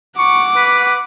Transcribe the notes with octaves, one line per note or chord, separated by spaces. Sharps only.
F#5 C#6 D6
B4